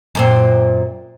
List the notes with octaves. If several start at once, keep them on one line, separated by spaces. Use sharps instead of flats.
F#2 A#2 C4